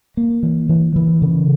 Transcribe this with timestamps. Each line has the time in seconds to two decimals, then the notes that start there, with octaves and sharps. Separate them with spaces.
0.17 A#3
0.43 E3
0.69 E3
0.96 E3
1.22 C#3